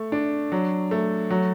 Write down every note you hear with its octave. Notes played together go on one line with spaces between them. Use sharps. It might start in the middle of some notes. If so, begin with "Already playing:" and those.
Already playing: A3
D4
F#3
A3
F#3